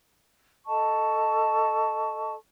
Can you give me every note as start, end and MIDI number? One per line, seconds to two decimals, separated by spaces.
0.66 2.34 69
0.66 2.34 75
0.66 2.34 81
0.66 2.34 85